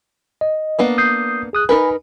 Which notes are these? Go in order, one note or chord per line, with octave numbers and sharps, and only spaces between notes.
D#5
A#3 B3 D4
D#6 G6 C7
G#4 D#6 F#6
D#4 A#4 B4 G#5 B5